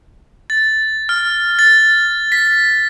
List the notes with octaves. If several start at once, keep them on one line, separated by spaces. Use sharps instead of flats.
A6
F6
A6
B6